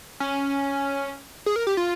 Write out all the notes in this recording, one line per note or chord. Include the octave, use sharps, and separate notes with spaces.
C#4
G#4
A#4
G4
F4